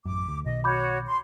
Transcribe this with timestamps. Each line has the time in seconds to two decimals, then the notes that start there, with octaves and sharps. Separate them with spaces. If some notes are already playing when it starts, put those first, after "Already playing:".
0.05 A1 F#2 D6
0.28 D2
0.44 B1 B2 D#3 D#5
0.64 F#4 C#5 B5 D6 G6
1.06 C6